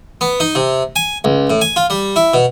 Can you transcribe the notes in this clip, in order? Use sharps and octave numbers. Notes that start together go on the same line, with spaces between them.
B3
D#4
C3
G#5
C#2
A2
G#5
F4
G3
E4
B2